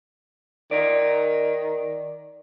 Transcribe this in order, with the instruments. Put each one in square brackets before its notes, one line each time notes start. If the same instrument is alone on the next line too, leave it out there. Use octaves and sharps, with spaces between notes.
[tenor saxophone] D#3 [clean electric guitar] A#4 D5